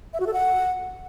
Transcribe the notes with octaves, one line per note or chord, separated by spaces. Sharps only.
E5
F#4
A4
F#5